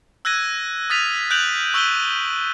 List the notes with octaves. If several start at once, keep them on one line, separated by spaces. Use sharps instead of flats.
E6 F#6 G#6 A#6 D#7
D#6 F6 A6 B6 D#7 F7
F#6 G6 D7 F7 F#7
C#6 E6 G6 D#7 F#7 G7